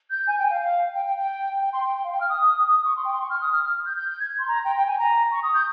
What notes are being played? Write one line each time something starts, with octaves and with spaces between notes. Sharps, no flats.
G6
G#5
G5
F5
F5
G5
G5
G5
G5
C6
G5
G5
F5
G5
F6
D#6
D#6
D#6
D#6
C#6
C6
G5
C6
C#6
F6
D#6
F6
F6
G6
G6
G6
G#6
C6
A#5
G5
G5
G#5
A#5
C#6
D#6
G6